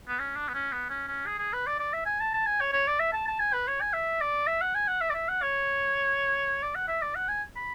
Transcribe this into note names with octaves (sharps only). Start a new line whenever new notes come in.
B3
C#4
D4
B3
C#4
B3
C#4
C#4
G#4
G#4
B4
D5
D5
E5
G#5
A5
A5
G#5
C#5
C#5
D5
E5
A5
A5
G#5
B4
C#5
G#5
E5
D5
E5
F#5
G#5
F#5
E5
D5
E5
F#5
C#5
D5
F#5
E5
D5
F#5
G#5
B5